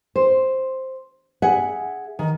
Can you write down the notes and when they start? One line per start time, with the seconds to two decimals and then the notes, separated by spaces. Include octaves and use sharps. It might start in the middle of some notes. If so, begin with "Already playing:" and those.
0.16 C5
1.42 G#4 E5 F#5
2.19 D#3